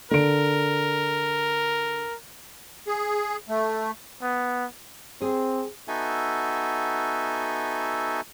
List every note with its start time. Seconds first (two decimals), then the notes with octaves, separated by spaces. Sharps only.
0.11 D3 A#4 D7
2.87 G#4
3.48 A3
4.21 B3
5.22 C4 G#4
5.88 B3 D#4 F#4 A4 E5 G#5